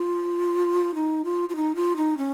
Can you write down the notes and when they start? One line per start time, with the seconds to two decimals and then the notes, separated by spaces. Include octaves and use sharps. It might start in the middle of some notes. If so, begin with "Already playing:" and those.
Already playing: F4
0.95 D#4
1.25 F4
1.49 F4
1.56 D#4
1.75 F4
1.96 D#4
2.17 C#4